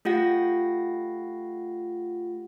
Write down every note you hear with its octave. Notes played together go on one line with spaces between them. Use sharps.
A3 F4 G4 F#5 A#6